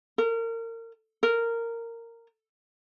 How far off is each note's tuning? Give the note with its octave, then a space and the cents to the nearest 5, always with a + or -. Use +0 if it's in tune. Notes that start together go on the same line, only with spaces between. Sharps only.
A#4 -30
A#4 -15